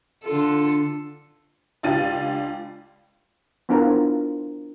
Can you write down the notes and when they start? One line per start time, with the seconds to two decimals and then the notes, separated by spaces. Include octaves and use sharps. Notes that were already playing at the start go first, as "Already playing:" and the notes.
0.24 D3 F4 A4
1.83 C#2 D4 F4 G4 A6 D#7
3.69 B3 D4 E4 F4 A#4 C5